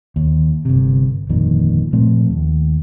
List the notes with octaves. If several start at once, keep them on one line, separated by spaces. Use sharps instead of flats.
D#2
G1 C3
G1 F2 A#2 D#3
A#2 F3 A3 C4
D#2